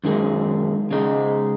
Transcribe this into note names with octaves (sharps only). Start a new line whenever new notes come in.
F#2 D#3 G#3
C#3 G#3 D#4